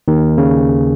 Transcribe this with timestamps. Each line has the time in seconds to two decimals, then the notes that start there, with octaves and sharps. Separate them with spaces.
0.08 D#2 D#3
0.38 C#3